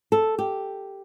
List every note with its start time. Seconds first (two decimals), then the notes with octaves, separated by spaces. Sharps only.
0.12 A4
0.38 G4